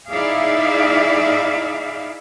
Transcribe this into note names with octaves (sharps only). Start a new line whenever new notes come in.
D#4 E4 G#4 D5 E5 F5